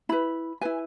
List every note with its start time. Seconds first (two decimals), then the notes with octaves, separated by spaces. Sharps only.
0.09 E4 B4 B5
0.61 E4 B4 G#5